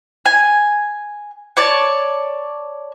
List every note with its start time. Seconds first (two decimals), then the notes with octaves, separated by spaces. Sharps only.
0.26 G#5
1.57 C#5 D5 A5